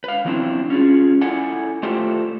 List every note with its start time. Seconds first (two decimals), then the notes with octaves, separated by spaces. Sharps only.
0.04 B4 F5
0.25 E3 F#3 B3 C4 D4 E4
0.70 C#4 F4 G#4
1.22 E4 A4 D5 F#5 G#5
1.83 A3 F4 G4 A4 C5 D5